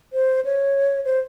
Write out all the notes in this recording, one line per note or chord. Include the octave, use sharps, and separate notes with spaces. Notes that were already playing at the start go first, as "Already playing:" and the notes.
C5
C#5
C5